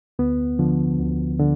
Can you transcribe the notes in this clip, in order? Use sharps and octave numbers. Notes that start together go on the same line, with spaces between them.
D2 B3
D3 F3
D2
D3